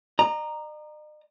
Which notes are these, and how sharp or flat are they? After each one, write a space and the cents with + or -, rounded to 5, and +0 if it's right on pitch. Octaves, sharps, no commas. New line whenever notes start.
D#5 -45 A#5 +0